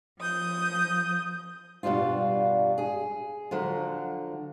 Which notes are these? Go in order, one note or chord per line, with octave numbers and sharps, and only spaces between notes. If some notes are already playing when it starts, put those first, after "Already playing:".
F3 D#6 G6
G2 B2 G3 D4 F4
G#4
D3 F3 F#3